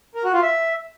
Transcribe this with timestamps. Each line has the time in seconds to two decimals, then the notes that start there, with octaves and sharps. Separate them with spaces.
0.15 A#4
0.24 F#4
0.33 F4
0.43 E5